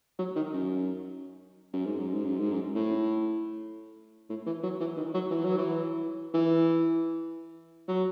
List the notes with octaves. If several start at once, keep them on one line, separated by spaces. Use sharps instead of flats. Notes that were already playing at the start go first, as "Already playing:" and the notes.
F#3
D#3
F#2
F#2
G#2
F#2
G#2
F#2
G#2
F#2
A2
A2
E3
F#3
E3
D#3
F#3
E3
F#3
E3
E3
F#3